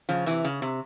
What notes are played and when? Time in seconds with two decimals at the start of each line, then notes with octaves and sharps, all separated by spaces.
0.09 C#3 F3
0.26 C3 E3
0.45 C#3
0.62 C3